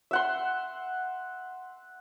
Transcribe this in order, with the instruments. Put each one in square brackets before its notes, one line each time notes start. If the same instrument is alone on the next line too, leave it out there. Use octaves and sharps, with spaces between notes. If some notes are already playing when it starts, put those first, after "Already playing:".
[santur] E5 F#5 C6